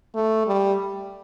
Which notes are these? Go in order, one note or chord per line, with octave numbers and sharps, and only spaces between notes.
A3
G3